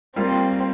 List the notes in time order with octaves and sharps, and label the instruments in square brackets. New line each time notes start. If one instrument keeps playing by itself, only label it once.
[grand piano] G3 A#3 F4 [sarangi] C4